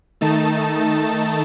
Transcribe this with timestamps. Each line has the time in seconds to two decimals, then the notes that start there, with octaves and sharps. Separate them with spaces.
0.21 D#3 A3 D#4 A5